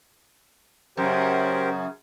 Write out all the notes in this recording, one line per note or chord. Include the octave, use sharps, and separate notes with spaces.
F#2 C#3 G4 A#4 C5